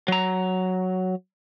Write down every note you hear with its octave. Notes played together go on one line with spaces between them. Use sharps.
F#3 A#5